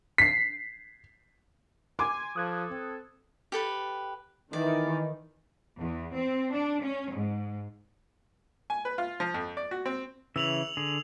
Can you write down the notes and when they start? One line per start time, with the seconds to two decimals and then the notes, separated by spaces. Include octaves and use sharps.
0.18 B6 C7
1.99 G#5 C6 D6
2.36 F3 A4 D#6 F#6 G#6
2.71 C4
3.52 G4 A4 B4
4.53 D#3 E3 D5
5.79 E2
6.14 C4
6.53 D4
6.82 C#4
7.13 G#2
8.70 G#5
8.85 B4
8.98 F4
9.20 F3
9.34 F2
9.57 D5
9.71 F#4
9.86 C4
10.36 C#3 E3 E5 E6 F7 F#7
10.77 D3 G#4